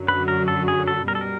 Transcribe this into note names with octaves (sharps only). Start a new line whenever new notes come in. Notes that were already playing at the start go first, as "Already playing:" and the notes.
Already playing: F#2 D3 F#3
B4
A#4
A4
G#4
A4
B2 G3 A#4
A4
A#4